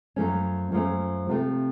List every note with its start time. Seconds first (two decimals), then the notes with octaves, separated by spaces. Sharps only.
0.16 F#2 F3 A3 C#4
0.72 F#2 F3 A3 C#4
1.29 C3 F3 A3 C4